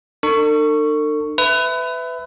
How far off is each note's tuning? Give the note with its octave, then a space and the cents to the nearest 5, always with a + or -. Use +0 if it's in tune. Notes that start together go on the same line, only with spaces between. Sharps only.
D4 +45 A4 +45 C#6 +0
B4 +25 E5 +0